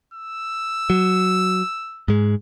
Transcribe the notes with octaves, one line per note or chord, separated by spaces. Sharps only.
E6
F#3
G#2 G#3